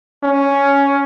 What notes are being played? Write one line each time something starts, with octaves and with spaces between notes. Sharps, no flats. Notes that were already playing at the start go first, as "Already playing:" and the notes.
C#4